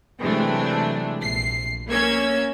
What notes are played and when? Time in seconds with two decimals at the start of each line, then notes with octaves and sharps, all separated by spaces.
0.20 C3 E3 F#3 G#3 A3 D4
1.20 A#1 C7
1.89 A#3 C#4 E6 G#6 C#7